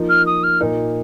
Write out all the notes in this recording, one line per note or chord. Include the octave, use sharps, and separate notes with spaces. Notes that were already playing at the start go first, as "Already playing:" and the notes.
Already playing: F3 A#3 D#4
F6
D#6
F6
A#2 A#3 D#4